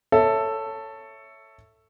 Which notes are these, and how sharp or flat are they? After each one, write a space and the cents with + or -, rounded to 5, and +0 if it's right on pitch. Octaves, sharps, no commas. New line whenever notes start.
A4 +10 C#5 +0 E5 +0